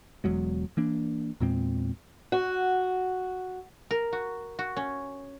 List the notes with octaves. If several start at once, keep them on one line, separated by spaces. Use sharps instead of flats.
E1 E2 F#3 G#3
E3 A#3 D4
E2 A#2 G#3 C4
F#4
A#4
F#4
F#4
C#4